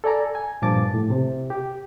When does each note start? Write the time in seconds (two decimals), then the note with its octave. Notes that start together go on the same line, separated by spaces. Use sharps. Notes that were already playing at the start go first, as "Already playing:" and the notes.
0.04 A4 D5 G#5 A#5
0.35 G#5
0.62 G2 A#2 F3 A5 D6 A6
0.94 A2
1.10 C3
1.50 G4